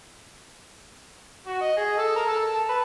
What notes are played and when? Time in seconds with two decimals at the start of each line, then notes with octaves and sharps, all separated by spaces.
1.47 F#4
1.61 D#5
1.77 G#4
1.97 A4
2.16 A#4
2.28 A4
2.54 A5
2.69 B4